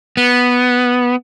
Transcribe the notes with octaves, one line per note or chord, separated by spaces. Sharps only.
B3